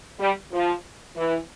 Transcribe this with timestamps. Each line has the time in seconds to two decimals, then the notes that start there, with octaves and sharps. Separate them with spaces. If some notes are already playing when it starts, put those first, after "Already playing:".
0.20 G3
0.52 F3
1.16 E3